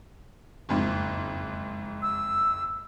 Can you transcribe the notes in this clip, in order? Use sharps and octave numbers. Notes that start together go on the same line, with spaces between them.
F#1 F2 G#2
E6